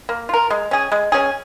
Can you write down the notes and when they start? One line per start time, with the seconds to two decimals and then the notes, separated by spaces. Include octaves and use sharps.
0.09 A#3
0.29 F4 A#4
0.50 G#3
0.71 C#4 G#4
0.92 G#3
1.12 C#4 G#4